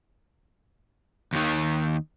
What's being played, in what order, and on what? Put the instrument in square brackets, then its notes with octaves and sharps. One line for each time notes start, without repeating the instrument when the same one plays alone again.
[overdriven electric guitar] D#2 D#3